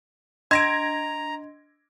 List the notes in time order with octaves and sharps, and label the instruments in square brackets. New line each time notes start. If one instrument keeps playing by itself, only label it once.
[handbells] D4 D#5 C6 [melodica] A#5 [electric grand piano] G#6 A#6 D7